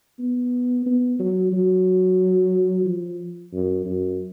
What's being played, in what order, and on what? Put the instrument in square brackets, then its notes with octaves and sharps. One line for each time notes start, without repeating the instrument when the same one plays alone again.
[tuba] B3
B3
F#3
F#3
F3
F#2
F#2